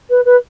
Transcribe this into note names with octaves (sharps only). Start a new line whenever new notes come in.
B4
B4